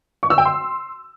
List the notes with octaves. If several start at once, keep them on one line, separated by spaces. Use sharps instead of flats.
C#6
E6
G5
C6